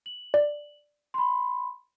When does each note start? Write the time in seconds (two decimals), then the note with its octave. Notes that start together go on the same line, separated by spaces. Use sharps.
0.06 F#7
0.34 D5
1.14 B5 C6